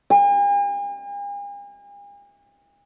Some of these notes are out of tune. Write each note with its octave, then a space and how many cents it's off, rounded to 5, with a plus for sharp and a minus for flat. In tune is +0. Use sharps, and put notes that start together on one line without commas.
G#5 -45